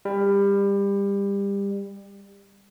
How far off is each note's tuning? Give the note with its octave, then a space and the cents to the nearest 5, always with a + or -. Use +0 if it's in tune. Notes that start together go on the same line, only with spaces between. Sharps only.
G3 +25